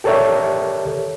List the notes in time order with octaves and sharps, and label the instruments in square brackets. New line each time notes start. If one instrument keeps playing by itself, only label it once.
[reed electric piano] G4 A4 A#4 C#5 D5 E5